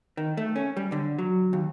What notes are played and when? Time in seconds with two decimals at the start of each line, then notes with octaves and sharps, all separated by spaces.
0.17 D#3
0.37 A3
0.56 C#4
0.77 G3
0.92 D3
1.18 F#3
1.53 D#2